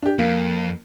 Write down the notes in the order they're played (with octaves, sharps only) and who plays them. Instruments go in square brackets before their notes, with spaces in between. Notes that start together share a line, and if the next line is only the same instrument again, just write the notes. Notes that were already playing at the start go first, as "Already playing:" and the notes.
[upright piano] D4 G4
[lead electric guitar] F2 [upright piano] A#3